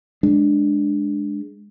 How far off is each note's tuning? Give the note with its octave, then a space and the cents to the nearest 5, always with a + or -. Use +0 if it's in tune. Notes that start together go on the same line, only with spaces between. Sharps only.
G#3 +0 D4 +0